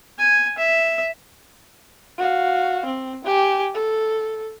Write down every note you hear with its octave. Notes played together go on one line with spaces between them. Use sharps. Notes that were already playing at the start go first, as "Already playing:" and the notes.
G#5
E5
F#4 F5
C4
G4 G#5
A4